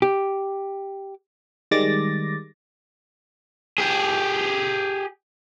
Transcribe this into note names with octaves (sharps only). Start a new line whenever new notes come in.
G4
D#3 G3 G#3 D6 A6 A#6
G4 G#4